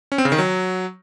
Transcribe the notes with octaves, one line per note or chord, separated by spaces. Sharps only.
C#4
C4
C#3
D#3
F#3